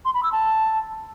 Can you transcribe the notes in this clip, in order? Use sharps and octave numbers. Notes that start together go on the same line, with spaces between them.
C6
B5
E6
A5